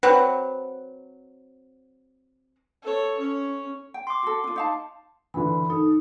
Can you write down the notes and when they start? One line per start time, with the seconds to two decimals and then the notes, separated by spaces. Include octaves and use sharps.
0.03 F#3 C4 B4 F#5
2.82 A4 C#5
3.19 C#4 C#5
3.94 G5
4.07 C6 D6
4.23 F#4 A4
4.44 D4 F4
4.56 D#4 F5 A5
5.34 D3 E3 B5
5.70 D#4 A4